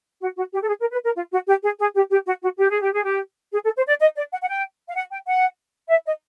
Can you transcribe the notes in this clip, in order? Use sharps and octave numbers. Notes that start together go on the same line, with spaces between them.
F#4
F#4
G4
A4
G#4
A#4
B4
A#4
F4
F#4
G4
G#4
G#4
G4
G4
F#4
F#4
G4
G#4
G4
G#4
G4
G#4
A4
C5
D5
D#5
D5
F#5
F#5
G5
F5
F#5
G5
F#5
E5
D#5